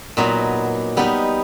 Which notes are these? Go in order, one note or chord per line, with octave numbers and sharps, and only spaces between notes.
A#2 F#3 B3 D#4
G3 B3 D#4